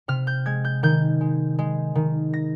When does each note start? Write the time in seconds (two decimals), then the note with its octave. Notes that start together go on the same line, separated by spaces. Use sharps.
0.08 C3 F6
0.27 G6
0.46 G#3 G#6
0.64 G6
0.83 D#3 G6
1.21 G#3
1.59 G#3
1.95 D#3
2.33 A#6